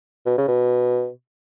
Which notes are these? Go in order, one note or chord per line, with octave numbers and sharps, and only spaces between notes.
B2
C#3
B2